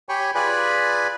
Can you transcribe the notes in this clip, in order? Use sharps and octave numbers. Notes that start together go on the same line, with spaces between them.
G4 C#5 G5 G#5 B5 C#6
F4 G#4 B4 D5 G#5 B5